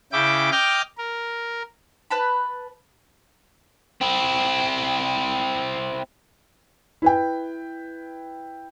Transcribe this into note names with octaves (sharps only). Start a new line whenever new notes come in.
C#3 E4 G5 D6
D#5 G5 D6 F6 G6
A#4
B4 A5 B5
C4 E4
E4 B4 G5